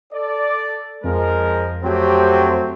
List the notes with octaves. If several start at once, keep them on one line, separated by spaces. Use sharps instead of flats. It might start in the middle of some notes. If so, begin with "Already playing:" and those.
A4 D5
F2 F3 G#3 A#4
F#3 A3 C4 G4 G5